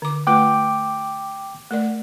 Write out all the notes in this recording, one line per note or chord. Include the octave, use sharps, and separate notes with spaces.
D3 D6
A3 F4 B4 G5 D6
A3 A#4 D5